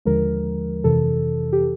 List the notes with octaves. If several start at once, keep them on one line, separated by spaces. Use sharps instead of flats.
D#2 D3 F3 G#3 A#4
F2 C3 E3 A4
G4